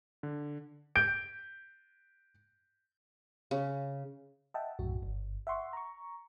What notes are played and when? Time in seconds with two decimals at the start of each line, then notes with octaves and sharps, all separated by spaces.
0.23 D3
0.96 G6 D7
3.51 C#3
4.54 D#5 E5 F#5 G5 A5
4.79 B1 F#2 A2 F#4
5.03 G1
5.47 E5 F#5 C6 C#6
5.73 A#5 C#6